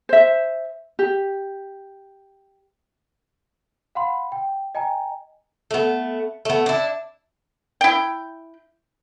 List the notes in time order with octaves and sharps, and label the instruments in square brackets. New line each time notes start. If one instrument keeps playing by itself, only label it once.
[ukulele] C5 E5
G4
[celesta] F5 F#5 B5 C6
G5
D#5 G5 G#5 A#5
[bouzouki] A3 B3
A3 B3
D4 E4
[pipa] E4 G5